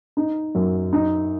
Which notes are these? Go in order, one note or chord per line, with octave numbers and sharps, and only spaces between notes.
D#4
F#2
D#4